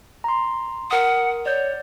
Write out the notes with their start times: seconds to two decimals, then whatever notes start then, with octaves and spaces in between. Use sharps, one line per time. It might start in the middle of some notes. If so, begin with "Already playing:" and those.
0.24 A#5 C6
0.91 A#4 F#5 D#6
1.46 C#5 D5 G6